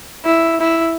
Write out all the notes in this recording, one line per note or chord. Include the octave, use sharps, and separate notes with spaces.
E4
E4